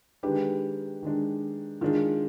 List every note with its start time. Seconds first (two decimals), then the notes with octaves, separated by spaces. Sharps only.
0.23 D#3 G#3 D4 G4 B4
1.02 D#3 G#3 D4
1.81 D#3 G#3 D4 F4 G#4